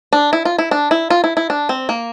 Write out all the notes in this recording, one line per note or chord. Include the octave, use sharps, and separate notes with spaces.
D4
E4
F4
E4
D4
E4
F4
E4
E4
D4
C4
A#3